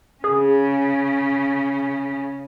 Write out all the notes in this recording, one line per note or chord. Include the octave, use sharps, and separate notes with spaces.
C#3 C#4 G#4